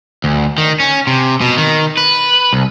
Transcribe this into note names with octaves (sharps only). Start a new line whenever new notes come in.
D2
D#3
C#4
C3
B2
D#3
B4
C2